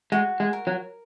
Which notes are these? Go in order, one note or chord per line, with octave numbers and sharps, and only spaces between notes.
G#3 F#4
G#3
A#4
F#3